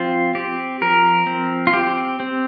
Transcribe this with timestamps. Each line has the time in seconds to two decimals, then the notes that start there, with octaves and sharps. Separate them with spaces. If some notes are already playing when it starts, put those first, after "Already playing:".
Already playing: F3 C4 F4
0.35 C4 G4
0.81 F3 A#4
1.27 C4
1.67 F4
1.73 C4 G4
2.20 C4